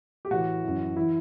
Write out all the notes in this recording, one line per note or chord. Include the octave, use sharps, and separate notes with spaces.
G4
A2 E3 F#4
F#2 E3
E3 E4